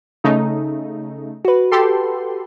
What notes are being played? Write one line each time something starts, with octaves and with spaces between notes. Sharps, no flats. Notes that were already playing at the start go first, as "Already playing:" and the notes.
C#3 A3 D#4
F#4 B4
G4 A4 C6